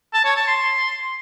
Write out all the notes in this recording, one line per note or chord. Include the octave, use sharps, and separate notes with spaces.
A5
C#5
A5
C6